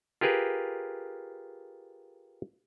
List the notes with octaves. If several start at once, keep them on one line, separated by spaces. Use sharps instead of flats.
F4 G4 G#4 A#4 B4